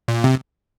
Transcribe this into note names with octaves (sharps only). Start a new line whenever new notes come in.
A#2
C3